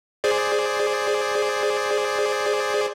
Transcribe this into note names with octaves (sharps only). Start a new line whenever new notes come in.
G#4 C5 D5